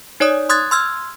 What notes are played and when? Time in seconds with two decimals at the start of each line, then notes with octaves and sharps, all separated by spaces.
0.20 D#4 C#5 D5 D#6
0.49 C6 D#6 F#6 G#6 A6
0.71 C6 E6 F6 G#6